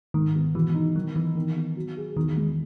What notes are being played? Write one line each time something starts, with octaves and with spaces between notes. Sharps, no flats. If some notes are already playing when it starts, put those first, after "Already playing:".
G#2 D#3
B3
B2 E3
D#4
D#3 F#3
E3 B3
D#3
B3
F#3
G#4
E2 D#3
G#3